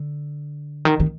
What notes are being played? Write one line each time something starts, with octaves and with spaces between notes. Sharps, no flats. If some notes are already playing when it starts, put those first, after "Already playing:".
Already playing: D3
D#3
D#3